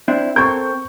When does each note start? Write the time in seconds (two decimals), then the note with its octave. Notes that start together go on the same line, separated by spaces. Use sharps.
0.08 C4 D4 E4
0.36 C4 A4 A#4 C#6 G6